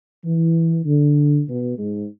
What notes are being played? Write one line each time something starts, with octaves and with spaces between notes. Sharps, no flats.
E3
D3
B2
G#2